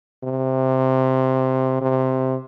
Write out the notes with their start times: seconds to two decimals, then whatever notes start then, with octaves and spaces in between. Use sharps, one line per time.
0.24 C3
1.81 C3